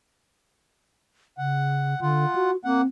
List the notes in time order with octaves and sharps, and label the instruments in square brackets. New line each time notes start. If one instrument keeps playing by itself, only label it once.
[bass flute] C#3 [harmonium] F#5
[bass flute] D3 [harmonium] F4 F#5
[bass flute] F#4
[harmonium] A#3 F#5 [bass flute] C4